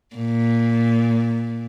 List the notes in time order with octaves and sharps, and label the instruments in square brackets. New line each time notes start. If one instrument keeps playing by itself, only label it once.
[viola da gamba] A#2